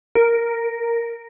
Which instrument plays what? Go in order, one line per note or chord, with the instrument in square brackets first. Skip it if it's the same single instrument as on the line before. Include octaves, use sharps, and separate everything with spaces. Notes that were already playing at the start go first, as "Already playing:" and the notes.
[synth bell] A#4